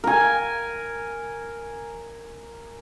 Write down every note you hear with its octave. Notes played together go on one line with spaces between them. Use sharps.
A#4 G#5